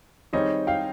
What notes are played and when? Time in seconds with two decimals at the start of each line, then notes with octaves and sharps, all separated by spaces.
0.33 D#3 G3 C4 D#4 G#4 C#5 D#5
0.67 F5 G5